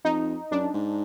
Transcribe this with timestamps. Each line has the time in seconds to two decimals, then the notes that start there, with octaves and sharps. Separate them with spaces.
0.05 F2 D#4
0.51 F#2 D4
0.74 G#2